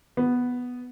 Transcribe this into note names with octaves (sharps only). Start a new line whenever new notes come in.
B3